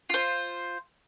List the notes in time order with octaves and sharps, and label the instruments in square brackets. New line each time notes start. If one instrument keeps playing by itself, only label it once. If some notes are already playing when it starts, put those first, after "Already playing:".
[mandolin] F4 C5